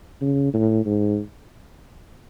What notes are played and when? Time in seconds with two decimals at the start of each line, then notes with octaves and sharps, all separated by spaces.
0.21 C#3
0.54 A2
0.86 G#2